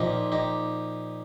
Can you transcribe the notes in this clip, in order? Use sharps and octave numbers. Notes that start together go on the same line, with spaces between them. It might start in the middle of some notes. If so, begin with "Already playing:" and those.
Already playing: A#2 F3 D#4 G4
D#4 G4